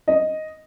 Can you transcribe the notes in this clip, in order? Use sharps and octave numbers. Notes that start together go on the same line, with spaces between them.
D#5